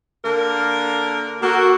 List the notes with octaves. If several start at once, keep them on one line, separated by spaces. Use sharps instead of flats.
D3 A#3 A#4
A#3 F#4 A4 A#4